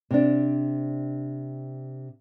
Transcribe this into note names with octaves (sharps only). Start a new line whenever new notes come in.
C3 D4